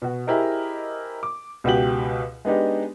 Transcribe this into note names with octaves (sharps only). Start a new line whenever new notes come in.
B2 F#4
E4 G4 G#4 A#4 C5 D#5
D6
C#2 B2 F#4 G4 F#7
G#3 B3 D4 D#4 G4